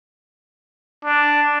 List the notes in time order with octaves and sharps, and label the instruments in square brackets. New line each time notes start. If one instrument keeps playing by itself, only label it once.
[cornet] D4